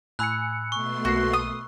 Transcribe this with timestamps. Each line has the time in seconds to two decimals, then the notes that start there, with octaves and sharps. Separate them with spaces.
0.19 A2 G#5 B5 E6 F#6 C#7
0.72 B2 A3 C6 C#6
1.05 B1 A#3 F#4 C7
1.33 D#6